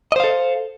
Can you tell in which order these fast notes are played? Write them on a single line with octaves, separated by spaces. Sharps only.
D#5 C5 F5 A4